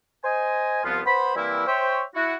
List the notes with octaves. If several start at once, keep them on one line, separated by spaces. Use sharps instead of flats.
C5 D#5 G#5
C2 F3 B3 F4
B3 C5 B5
E3 G3 A#3 C4 E4
C5 C#5 E5 G5
E4 F#4